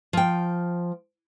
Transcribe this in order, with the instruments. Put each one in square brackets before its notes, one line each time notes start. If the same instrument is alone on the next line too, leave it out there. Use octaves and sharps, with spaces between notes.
[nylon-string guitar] F3 G5